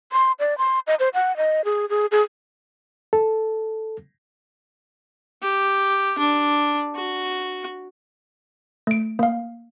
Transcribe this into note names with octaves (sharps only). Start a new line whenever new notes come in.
C6
D5
C6
D#5
C5
F#5
D#5
G#4
G#4
G#4
A4
G4
D4
F#4
A3 D7
A#3 F5